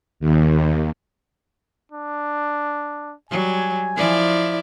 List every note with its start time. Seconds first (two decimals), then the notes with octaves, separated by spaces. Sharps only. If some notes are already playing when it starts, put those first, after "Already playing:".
0.20 D#2
1.92 D4
3.31 F#3 G3 G#5
3.96 F3 E4 D5